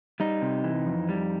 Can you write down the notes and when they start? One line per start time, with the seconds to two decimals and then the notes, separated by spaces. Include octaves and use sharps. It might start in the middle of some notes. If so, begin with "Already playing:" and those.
0.20 G3 D#4
0.42 C3
0.64 E3
0.86 F2
1.09 G3